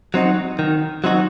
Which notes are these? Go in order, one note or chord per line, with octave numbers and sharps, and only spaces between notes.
F#3 C4 D#4 F#4
D#3
F#3 C4 D#4 F#4